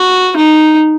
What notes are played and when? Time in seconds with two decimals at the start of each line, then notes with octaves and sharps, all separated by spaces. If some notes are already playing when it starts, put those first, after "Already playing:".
Already playing: F#4
0.36 D#4